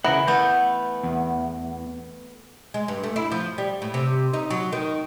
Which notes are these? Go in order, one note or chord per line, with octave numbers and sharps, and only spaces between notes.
C#3 E3 A#4 F#5
A3 B3 F#5 G6
E2
G#3
G2
A3
E4
F3
G3
A2
C3
D#4
F#3
D#3